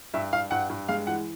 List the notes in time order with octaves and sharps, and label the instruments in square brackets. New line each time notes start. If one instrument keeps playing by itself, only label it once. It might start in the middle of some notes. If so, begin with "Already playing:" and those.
[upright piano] G2 E5
G2 F5
G2 F#5
G2
G#3 F5
E3 F#5